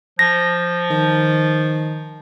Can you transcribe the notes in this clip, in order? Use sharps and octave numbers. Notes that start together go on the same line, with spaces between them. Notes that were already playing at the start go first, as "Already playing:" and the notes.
F3 A#6
D#3